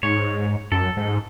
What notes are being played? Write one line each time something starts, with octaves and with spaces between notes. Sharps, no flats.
G#2 C#5
F#2 A4
G#2